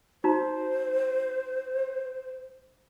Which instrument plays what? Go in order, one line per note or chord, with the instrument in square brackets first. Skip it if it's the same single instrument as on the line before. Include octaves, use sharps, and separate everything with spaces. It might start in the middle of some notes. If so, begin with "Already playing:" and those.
[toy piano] D#4 F#4 A#5 [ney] C5